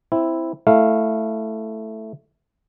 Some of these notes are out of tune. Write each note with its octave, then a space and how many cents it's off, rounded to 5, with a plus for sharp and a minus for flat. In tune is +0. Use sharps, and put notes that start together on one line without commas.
C4 +0 E4 +0
A3 +0 E4 +5 F5 +0